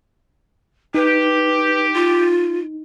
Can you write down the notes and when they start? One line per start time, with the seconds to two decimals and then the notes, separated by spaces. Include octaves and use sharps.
0.95 D#4 G4 B4
1.94 F4